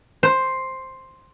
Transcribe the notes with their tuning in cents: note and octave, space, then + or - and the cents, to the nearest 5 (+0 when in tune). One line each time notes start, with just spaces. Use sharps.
C5 +5